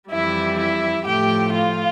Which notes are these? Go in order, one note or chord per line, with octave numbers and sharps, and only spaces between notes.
F2 E3 G3 E4 E5
E4 E5
A2 F3 A3 G4 G5
F4 F5